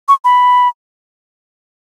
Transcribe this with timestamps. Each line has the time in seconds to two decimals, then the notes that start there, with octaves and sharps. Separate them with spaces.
0.08 C#6
0.25 B5